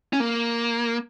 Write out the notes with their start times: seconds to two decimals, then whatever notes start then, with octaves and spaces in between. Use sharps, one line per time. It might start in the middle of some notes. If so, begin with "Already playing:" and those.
0.13 C#4
0.20 A#3